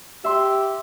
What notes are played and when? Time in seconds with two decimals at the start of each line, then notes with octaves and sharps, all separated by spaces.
0.24 G4 E5 C6